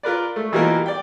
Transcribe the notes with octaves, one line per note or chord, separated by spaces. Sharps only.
F4 A#4 B4 D5
A3
B2 E3 G3 A#3 F4 A#4
D5 G5